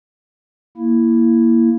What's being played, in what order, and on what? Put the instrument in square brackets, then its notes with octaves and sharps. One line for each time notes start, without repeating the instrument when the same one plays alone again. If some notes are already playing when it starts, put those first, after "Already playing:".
[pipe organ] A#3 E4